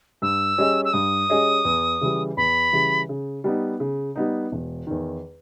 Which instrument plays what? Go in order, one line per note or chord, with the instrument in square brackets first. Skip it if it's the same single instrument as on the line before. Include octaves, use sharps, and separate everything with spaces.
[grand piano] G2 [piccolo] E6
[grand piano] G3 C#4 G#4 D#5
[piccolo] E6
[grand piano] G2 [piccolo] D#6
[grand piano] G3 C#4 G#4 D#5
E2
C#3 E3 G3
[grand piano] E2 [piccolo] B5
[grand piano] C#3 E3 G3
C#3
G3 B3 D#4
C#3
G3 B3 D#4
E1
E2 D#3